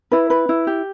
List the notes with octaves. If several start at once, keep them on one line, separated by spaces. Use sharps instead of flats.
E4 B4
B4
E4
G4